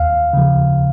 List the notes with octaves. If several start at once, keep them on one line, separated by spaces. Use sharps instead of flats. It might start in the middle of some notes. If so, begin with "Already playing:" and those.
Already playing: D#2 F5
C#3 F3